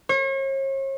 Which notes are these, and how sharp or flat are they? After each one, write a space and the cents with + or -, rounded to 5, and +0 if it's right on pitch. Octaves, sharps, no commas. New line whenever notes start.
C#5 -40